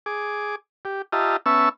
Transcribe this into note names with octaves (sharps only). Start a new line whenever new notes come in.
G#4 D6
G4
F4 G4 D#5 E5 A5 A#5
B3 C#4 E5 A5 C#6 E6